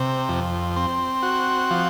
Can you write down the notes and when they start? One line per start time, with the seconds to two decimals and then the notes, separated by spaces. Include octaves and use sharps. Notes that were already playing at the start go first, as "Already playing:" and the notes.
Already playing: C3
0.29 F2
0.76 C4
1.23 F#4
1.71 F3